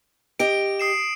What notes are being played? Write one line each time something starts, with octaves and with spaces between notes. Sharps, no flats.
G4 D#5 D7
D#6 C7 E7